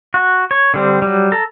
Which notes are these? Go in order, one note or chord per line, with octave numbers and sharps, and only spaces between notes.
F#4
C#5
D3 G3 C4
F#3 G3
A4 A#5